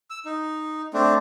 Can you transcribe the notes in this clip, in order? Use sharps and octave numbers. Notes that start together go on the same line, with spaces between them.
E6
D#4
A3 C4 D4